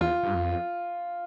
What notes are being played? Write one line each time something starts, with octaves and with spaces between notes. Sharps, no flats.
E2 F4
G2
F2